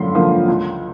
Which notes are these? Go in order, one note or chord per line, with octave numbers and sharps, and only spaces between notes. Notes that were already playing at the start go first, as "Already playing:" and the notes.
Already playing: F#2 D3 F3 B5 C6
D3 F3 A#3
C#2